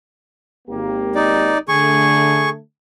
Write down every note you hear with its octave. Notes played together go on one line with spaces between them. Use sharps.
G#1 A#3 G4
D#4 D5
D3 A3 G#4 C#6